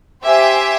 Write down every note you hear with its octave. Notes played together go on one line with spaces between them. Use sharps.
G4 C5 E5 G#5